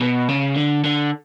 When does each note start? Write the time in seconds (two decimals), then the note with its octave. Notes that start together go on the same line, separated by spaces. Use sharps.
0.01 B2
0.29 C#3
0.56 D3
0.84 D3